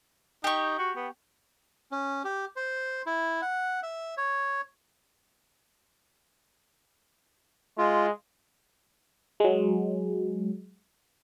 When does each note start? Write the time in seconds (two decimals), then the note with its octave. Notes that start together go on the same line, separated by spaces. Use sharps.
0.44 D#4 G4 C#6
0.79 F#4
0.96 B3
1.91 C#4
2.24 G4
2.56 C5
3.06 E4
3.42 F#5
3.83 E5
4.17 C#5
7.78 G#3 F4
9.40 F#3 G#3